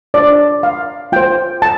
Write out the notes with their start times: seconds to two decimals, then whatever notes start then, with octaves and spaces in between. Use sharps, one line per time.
0.14 D4 F4 C5 D5
0.63 F5
1.12 F4 C5 G5
1.62 A5